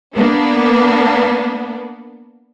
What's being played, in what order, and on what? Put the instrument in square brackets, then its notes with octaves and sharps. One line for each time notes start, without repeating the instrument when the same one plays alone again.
[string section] A#3 B3 D4